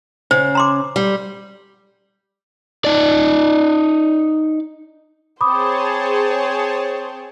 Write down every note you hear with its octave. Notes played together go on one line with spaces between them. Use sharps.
C#3 C5
A#5 C6 D6
G3
D#4 D5
C4 G#4 C5 C#5 A5 B5 D6 D#6